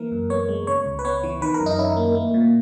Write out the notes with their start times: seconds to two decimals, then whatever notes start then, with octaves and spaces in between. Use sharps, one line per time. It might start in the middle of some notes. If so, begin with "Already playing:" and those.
Already playing: E3 A#3 A#4
0.12 F#2
0.30 B3 C#5
0.49 G#3
0.67 C#3 C#5
0.86 C#2
0.99 B4
1.05 B3 C#5
1.24 E3
1.41 D#3 B4
1.54 A#4
1.61 F#2
1.66 D#4
1.78 C#4 E4
1.97 A#3
2.15 A#3
2.34 A#2